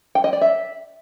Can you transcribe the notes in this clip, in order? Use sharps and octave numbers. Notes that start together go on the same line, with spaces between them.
G5
D#5
D5
E5